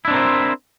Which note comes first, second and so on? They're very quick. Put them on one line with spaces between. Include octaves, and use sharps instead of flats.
E4 D4 C4 A#4 C5